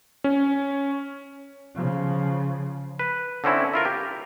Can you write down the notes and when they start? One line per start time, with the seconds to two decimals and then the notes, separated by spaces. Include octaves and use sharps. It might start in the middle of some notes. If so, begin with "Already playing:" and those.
0.24 C#4
1.75 C#3 F3
2.99 B4
3.44 D3 C4 C#4 E4
3.74 E4 F4 A#4
3.85 G4